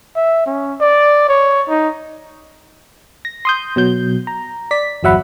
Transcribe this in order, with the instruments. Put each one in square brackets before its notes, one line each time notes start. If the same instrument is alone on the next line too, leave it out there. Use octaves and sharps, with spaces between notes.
[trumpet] E5
C#4
D5
C#5
D#4
[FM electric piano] A#6
C6 D#6 G6
B2 F#3 G6
A#5
D5 B6
G1 E2 F#3 E5 F#5 B5